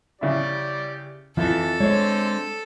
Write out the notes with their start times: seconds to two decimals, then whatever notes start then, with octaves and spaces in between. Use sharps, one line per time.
0.21 C#3 E4 G4 D5
1.37 F2 E3 A4 A5
1.80 D3 G#3 C4 C#5